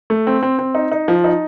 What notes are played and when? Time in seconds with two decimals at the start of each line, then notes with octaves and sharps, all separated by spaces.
0.10 A3
0.27 C4
0.43 C4
0.59 C4
0.75 D#4
0.92 D#4
1.08 F3
1.24 D#4